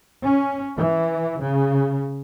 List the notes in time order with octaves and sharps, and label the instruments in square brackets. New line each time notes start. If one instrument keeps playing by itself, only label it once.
[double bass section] C#4
E3
C#3